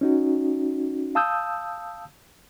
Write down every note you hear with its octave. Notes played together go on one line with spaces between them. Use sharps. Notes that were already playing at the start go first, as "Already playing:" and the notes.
C#4 D#4 F#4
F5 A5 D#6 E6 G6